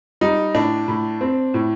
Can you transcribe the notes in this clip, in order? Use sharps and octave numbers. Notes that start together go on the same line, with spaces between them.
G3 D#4
A2 D4
A2
C4
A2